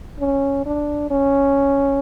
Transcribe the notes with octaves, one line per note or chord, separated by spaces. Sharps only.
C#4
D4
C#4